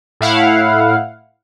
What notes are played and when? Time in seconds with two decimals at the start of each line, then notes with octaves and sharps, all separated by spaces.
0.21 A2 E4 F5 F#5